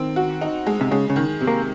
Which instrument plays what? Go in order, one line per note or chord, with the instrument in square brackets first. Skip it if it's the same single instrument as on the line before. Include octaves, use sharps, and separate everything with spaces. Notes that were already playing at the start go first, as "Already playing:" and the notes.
Already playing: [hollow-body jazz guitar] D#3 [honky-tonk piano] C4
[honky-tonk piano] F#4
D#4
G#3
[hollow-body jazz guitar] C3
[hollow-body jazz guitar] C#3 [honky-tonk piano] G#3
[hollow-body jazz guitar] C#3
[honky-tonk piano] D#3
C3
[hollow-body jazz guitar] A#3